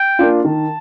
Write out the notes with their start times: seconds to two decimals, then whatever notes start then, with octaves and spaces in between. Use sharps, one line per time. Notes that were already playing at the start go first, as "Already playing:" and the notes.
Already playing: G5
0.19 A#3 D4 F4
0.45 D#3 A5